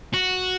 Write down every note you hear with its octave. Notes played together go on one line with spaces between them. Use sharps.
F#4